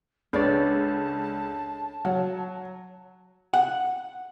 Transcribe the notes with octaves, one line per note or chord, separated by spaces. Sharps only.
C#2 D4 A4 B4 C#5 D5 A5 A6
F#3 F#5
F#5